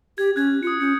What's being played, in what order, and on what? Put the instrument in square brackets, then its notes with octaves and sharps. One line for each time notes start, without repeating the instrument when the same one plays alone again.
[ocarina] G4 [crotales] G#6
[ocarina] C#4 [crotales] F#6 G#6
[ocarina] F4 [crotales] D#6 C#7
[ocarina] C#4 [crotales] D#6 G6 C#7